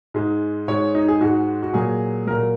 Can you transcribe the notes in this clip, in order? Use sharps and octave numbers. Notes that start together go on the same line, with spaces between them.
G#2 G#3
G#2 G#3 C#5
D#4
G#4
G#2 G#3 F#4
F#4
A#2 F#3 G#4
A#2 F#3 A#4